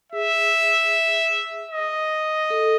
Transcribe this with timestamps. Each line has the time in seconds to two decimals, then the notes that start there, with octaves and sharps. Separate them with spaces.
0.12 G#4 E5
1.71 D#5
2.50 A4